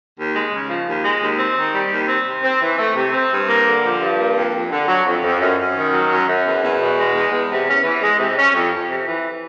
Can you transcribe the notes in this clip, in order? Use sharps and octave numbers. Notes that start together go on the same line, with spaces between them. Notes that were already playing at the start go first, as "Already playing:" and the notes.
D#2
G#3
C#3
F3
D#2
G#3
D#2
C4
D#3
G3
D#2
C4
C3
C4
E3
A3
C3
C4
G2
A#3
D3
F3
G2
A#3
F2
F2
D3
F#3
F2
F2
F#2
F#2
D#3
F#3
F#2
F#2
E2
E2
B2
G#3
E2
E2
C3
C#4
E3
G#3
C3
C#4
F2
F2
C3
E3